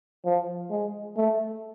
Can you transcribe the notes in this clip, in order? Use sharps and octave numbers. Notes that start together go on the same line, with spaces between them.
F3
G#3
A3